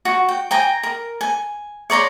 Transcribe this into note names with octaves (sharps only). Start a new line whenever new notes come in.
F#4
G5
G5 G#5 A#5
A#4
G#5
C#5 D5 A#5 C6